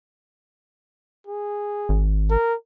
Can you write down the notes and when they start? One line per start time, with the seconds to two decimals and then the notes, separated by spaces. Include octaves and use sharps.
1.27 G#4
1.89 G#1
2.30 A#4